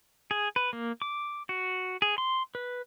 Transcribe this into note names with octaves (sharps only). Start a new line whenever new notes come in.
G#4
B4
A#3
D6
F#4
G#4
C6
B4